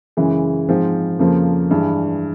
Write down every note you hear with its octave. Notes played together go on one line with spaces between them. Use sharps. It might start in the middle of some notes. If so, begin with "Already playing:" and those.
F#2 C#3 E3 G#3
G#2 F3 G#3 C4
F2 C#3 F3 A#3
G2 E3 G#3